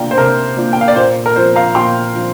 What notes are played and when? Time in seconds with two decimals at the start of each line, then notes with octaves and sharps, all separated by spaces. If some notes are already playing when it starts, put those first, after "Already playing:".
Already playing: C3 A#3 D4 F4 G5 A#5
0.11 C5
0.17 C3 A#4
0.57 A#3 D4 F4
0.73 G5
0.81 F5
0.88 D5
0.96 A#2 C5
1.26 A#4
1.36 F3 C4 C5
1.56 F5 A#5
1.75 A#2 G5 C6
2.16 F3 C4